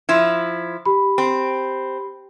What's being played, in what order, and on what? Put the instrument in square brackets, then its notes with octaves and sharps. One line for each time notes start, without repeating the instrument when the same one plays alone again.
[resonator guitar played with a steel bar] F3 E4 [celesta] G#6
[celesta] G4 B5
[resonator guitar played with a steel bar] C4